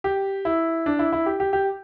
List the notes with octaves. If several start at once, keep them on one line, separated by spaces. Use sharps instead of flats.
G4
E4
D4
E4
E4
G4
G4
G4